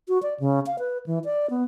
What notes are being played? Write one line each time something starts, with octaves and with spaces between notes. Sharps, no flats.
F#4
D5
C#3
F5
B4
E3
D5
B3